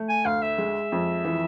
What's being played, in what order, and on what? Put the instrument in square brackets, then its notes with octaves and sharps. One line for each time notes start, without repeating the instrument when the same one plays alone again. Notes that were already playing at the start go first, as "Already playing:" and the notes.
Already playing: [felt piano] A3
[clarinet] G#5
[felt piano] D2 [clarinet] F5
[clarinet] E5
[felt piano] G#3
F2
E3